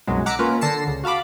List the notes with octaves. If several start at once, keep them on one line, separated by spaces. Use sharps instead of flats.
C2 F#2 B2 F#3 G#3
F#5 A#5 D6 E6 B6 C#7
A#3 C#4 F4 B4
D3 A5 A#6 C7 C#7 E7
C#2
F#4 F5 A5 B5 D6